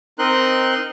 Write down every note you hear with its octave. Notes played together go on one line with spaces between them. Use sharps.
C4 D#4 A#4 D#5 C6 F#6